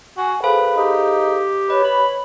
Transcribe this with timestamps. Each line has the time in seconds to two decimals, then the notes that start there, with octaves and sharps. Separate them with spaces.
0.17 F#4 G#5
0.44 G#4 A4 B4 C5 F5
0.77 D#4 G4
1.70 B4 C#5 D#5
1.84 B5